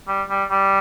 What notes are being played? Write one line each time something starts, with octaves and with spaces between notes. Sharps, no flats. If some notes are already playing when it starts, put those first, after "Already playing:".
G3
G3
G3